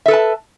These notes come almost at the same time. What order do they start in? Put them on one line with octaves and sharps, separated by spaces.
E5 A4 B4 A5